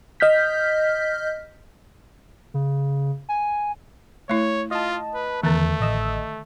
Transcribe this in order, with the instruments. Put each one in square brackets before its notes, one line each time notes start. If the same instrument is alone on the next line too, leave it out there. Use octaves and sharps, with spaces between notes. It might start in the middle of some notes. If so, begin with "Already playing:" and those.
[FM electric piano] D#5 F6 G6 B6
[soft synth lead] C#3
G#5
[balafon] A3 E4 [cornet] C#5
[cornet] F4 [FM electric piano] D#5 A5
[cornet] B4
[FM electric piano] E2 [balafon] D3 D#3 [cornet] A3
[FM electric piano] A1 D#5 E6